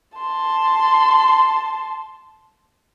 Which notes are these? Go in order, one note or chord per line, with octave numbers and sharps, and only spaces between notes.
A5 C6